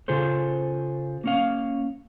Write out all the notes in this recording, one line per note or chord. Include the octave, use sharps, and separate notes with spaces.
C#3 F4 G#4 A4 C5
A#3 C#4 F5